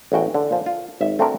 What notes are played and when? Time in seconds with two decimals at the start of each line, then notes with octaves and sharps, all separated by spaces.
0.12 A1 E2 F#4 G5
0.34 D3
0.51 A#2 F3
0.66 F4
1.01 G#1 E5
1.19 A3 C4 D4 F#4 A#4